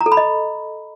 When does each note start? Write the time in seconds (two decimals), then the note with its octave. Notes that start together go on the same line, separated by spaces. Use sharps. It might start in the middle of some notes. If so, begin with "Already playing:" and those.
0.01 A#5
0.06 A4
0.12 B5
0.17 D#5